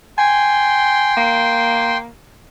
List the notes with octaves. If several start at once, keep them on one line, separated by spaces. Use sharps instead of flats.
G5 G#5 C6
A#3